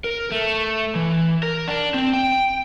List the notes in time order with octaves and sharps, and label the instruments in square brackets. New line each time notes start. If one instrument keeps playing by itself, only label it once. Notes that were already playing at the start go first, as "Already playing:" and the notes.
[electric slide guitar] A#4
A3
E3
A#4
D4
C4
G5